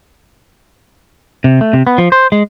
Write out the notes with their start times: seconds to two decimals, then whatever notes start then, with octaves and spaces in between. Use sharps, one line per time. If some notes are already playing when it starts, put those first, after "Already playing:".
1.44 C3
1.61 A3
1.73 C3
1.87 B3
1.98 F3
2.12 C5
2.32 G#3